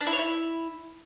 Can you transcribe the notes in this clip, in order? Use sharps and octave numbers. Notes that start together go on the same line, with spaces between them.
D4
E4
C#5
E4